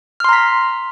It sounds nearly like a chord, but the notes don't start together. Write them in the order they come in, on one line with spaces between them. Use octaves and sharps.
F6 C6 A#5 B6